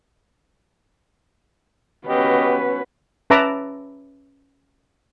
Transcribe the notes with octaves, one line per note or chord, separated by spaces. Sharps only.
B3 C#4 F#4 G4 B4 D#5
C#4 B4 E5 A5 A#5 D6